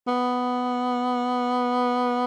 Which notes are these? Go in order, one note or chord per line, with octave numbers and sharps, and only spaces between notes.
B3